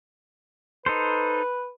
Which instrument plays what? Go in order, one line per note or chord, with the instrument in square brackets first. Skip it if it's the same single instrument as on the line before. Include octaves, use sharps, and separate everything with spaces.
[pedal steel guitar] D#4 A4 C5 [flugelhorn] B4